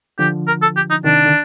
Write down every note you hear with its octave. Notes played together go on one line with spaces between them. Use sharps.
D3 F3 G4
A#4
A4
G4
D#4
C3 D#3 D4
D3